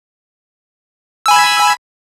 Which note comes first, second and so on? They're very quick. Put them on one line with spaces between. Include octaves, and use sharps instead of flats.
E6 G#5 B5